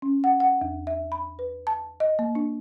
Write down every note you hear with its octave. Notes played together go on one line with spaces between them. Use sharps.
C#4
F#5
F#5
E2
E5
B5
B4
A5
D#5
A#3
D4